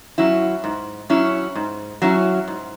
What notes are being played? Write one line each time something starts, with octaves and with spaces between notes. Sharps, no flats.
F#3 C#4 E4
G#2
F#3 C#4 E4
G#2
F#3 C#4 E4
G#2